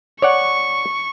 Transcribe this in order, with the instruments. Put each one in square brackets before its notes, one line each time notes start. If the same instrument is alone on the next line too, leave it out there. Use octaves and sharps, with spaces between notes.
[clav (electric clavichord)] C#5 D5 F#5 [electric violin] C#6